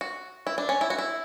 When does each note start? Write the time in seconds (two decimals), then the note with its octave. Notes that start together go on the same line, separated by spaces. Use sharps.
0.01 F#4
0.47 E4
0.58 D4
0.69 C#4
0.81 E4
0.90 F#4
0.98 E4